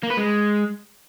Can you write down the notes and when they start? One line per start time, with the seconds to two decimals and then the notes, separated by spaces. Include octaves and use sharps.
0.03 A#3
0.10 B4
0.17 G#3